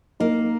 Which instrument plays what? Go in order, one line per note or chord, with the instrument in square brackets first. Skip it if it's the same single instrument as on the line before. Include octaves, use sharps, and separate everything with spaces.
[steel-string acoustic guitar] A#3 [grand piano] D#4